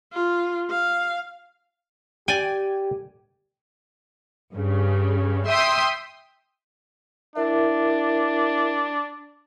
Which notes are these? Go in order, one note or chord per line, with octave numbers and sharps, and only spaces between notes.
F4
F5
G4 D5 G5 G#5
G2 C#3
E5 G5 C6 D#6
D4 E4 A#4 E5